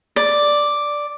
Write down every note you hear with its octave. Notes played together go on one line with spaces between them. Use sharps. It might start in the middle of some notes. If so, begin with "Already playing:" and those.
D5